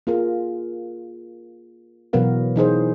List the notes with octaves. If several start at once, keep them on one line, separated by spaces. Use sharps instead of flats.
A#3 F4 G#4 A#4
B2 E3 F#3 B3 A#4 F5
E3 D#4 G#4 C5